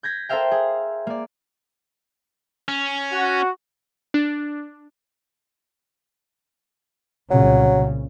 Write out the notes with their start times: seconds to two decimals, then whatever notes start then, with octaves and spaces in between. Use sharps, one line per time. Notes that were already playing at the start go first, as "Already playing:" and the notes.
0.03 G6 G#6 A#6 B6
0.29 A4 A#4 C5 E5 F5 G5
0.51 G#4
1.07 A#3 D5
2.68 C#4
3.13 F#4
4.14 D4
7.31 C2 A#2 C#3 F#3